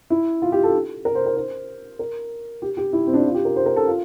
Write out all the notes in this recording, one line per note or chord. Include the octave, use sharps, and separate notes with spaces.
E4
F4
G4
A4
A#4
C5
A#4
C5
A#4
G4
G4
E4
C4
D4
E4
F4
G4
A#4
C5
A#4
A4
F4